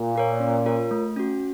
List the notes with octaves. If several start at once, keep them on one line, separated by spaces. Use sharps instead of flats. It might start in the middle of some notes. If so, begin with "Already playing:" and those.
Already playing: A#2
F4 A#4 C#5
C#4
F4 A#4 C#5
A3
C#4 F#4